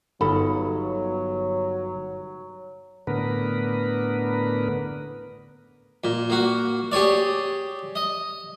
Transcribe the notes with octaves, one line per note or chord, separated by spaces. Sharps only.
G1 F#3 D#4 A4 B5
A2 D3 B3 A#4 B4
A#2
A#3 F#4
G4 G#4 C#5 D5
D#5